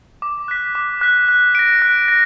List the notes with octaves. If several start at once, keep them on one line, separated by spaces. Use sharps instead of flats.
D6
F#6 B6
D6
F#6 B6
F#6
A#6 D7
F#6
A#6